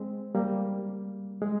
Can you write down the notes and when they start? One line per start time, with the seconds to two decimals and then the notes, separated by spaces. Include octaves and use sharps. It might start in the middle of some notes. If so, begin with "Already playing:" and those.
Already playing: G#3 C4
0.35 G3 A#3
1.42 G#3